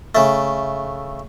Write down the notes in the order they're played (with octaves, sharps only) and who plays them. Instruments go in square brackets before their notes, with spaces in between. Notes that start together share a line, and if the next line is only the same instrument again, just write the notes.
[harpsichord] C#3 A3